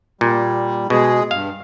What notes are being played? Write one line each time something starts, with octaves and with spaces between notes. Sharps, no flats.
A#2 G3
B2 G#3 G#4
G2 F5